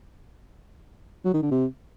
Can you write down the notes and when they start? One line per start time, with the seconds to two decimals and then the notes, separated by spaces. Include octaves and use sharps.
1.25 F#3
1.34 D#3
1.42 D3
1.51 C3